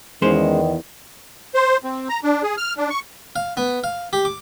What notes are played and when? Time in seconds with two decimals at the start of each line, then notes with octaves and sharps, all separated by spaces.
0.22 E2 D#3 G#3 C#4 C5
1.55 C5
1.84 C4
2.09 A#5
2.24 D4
2.43 G#4
2.57 F6
2.78 D4
2.90 C#6
3.36 F5
3.57 B3
3.84 F5
4.13 G4
4.25 D6